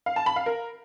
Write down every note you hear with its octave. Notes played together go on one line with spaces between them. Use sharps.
F5
A5
B5
F5
A#4